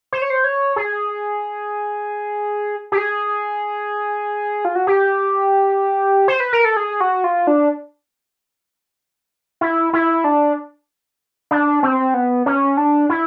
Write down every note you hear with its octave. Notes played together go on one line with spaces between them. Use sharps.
C5
C#5
C5
C#5
G#4
G4
G#4
F4
F#4
G4
C5
B4
A#4
A4
G#4
F#4
F4
D4
E4
E4
D4
D4
C4
B3
C#4
D4
E4